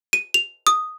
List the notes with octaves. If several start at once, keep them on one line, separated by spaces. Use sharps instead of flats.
D#7
F7
D#6